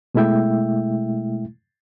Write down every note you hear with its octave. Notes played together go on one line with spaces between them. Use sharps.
B2 G#3 A3 E4 E5 G5